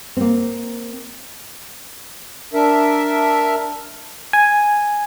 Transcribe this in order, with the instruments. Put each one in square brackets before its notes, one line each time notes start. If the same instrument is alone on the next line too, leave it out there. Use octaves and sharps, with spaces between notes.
[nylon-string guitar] A#3 C4
[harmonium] D4 A#4 E5
[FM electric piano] G#5